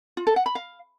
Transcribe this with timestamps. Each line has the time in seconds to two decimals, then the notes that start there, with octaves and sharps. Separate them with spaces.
0.17 F4
0.27 A4
0.36 F#5
0.46 B5
0.55 F5